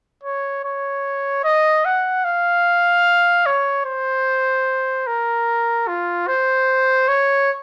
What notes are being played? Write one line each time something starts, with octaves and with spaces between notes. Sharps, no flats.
C#5
C#5
D#5
F#5
F5
C#5
C5
A#4
F4
C5
C#5